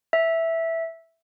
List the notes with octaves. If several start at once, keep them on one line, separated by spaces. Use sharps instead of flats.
E5